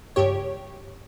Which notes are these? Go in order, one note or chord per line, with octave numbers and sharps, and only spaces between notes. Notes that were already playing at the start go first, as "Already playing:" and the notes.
C#2 G2 G4 C#5